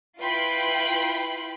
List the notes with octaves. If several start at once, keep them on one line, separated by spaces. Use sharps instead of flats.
E4 F4 B4 G5 B5 C6